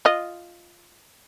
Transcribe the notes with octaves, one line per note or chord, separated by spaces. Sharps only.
F4 D#5